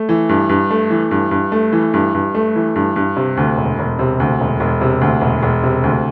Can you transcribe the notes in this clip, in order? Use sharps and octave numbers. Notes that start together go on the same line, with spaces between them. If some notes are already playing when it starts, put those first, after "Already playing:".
Already playing: A3
E3
G2
G2
A3
E3
G2
G2
A3
E3
G2
G2
A3
E3
G2
G2
C3
D2
E1
E1
C3
D2
E1
E1
C3
D2
E1
E1
C3
D2